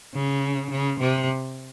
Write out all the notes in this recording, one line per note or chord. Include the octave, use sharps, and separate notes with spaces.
C#3
C#3
C3